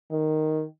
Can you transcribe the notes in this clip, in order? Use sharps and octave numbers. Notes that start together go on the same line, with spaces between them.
D#3